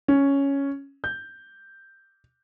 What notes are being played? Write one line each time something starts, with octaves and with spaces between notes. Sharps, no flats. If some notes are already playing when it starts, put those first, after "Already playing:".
C#4
G6